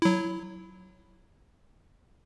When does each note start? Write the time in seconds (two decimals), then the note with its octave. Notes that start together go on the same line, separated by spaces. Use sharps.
0.02 F#3 E4